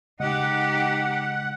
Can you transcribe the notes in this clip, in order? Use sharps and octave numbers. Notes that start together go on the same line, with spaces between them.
C#3 G#3 D#4 G4 D#5 F#5